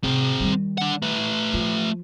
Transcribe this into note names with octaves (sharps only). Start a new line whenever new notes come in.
C3 C4 G#4
D#3 G3
D4 F#5
A3 B4
F3 F4